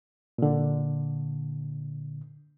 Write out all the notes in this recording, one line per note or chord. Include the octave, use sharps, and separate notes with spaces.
A#2 D3